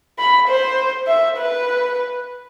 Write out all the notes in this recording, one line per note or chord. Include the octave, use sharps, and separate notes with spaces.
B5
C5
E5
B4